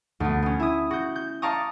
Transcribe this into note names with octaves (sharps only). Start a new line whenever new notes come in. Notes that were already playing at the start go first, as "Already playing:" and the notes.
D2 B3
B3 C#4
E4 D#6
F#4 G6
G6
D5 F5 A5 A#5 C#6 D#6